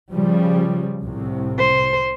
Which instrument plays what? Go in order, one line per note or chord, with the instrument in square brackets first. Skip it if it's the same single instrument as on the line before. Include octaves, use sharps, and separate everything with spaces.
[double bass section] C#3 F3 G3
C2 A2 C3
[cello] C5